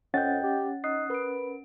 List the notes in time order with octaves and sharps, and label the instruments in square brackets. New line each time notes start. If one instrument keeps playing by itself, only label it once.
[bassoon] F2 [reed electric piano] C#4 F#5 A6 [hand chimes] D#5 G5 G6
[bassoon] G4
[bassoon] D#4 [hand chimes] D#6 F#6 C7
[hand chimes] A#4 D7 [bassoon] B4